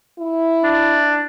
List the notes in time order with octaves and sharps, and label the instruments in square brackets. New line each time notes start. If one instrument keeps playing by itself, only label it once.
[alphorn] E4
[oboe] D4